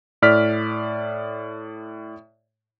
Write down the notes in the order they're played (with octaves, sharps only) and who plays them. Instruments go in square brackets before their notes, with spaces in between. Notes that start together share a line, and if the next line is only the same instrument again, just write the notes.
[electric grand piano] A2 D5 F6 B6